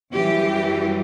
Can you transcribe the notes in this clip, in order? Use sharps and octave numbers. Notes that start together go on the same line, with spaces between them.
F#2 E3 G3 G4